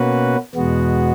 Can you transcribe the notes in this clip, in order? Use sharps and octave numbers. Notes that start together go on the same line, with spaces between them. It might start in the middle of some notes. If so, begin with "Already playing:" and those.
Already playing: B2 A#3 C#4 F#4 B4
E2 B2 G#3 B3 F#4